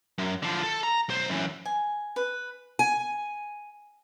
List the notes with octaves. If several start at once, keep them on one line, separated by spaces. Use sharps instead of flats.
F#2
D3 F3
A4
A#5
B1 C5
F#2 E3
G#5
B4
G#5